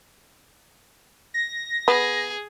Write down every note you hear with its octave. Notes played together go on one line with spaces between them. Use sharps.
A#6
B3 G#4